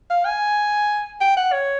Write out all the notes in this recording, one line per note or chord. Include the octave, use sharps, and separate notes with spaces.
F5
G#5
G5
F#5
C#5